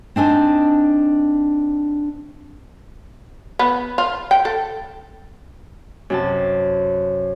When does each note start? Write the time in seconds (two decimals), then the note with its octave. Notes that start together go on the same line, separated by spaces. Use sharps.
0.16 C4 D4 D#4 G#5
3.59 B3
3.98 F4
4.31 G5
4.45 A4
6.10 F#2 C3 A5